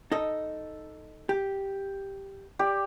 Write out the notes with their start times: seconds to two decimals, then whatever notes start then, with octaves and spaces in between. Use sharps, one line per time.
0.12 D#4 A4 D#5
1.29 G4
2.59 G4 D5